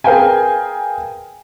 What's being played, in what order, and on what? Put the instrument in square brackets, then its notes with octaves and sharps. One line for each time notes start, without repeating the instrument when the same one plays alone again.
[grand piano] G#4 A#4 B4 F5 G5 G#5